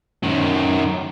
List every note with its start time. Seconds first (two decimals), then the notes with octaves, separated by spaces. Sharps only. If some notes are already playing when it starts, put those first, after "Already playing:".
0.23 F#2 D#3